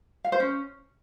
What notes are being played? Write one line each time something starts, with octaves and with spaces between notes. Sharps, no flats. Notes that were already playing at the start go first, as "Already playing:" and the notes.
F5
C5
C#4